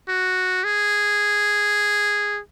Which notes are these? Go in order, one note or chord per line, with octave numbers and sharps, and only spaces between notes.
F#4
G#4